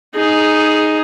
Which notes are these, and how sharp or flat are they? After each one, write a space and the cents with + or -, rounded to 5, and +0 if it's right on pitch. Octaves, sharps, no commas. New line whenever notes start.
D#4 +0 G#4 +10